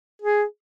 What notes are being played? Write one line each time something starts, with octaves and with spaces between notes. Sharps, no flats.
G#4